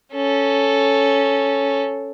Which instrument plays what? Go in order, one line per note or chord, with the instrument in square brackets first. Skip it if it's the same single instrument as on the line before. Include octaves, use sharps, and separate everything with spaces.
[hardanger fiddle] C#4 A4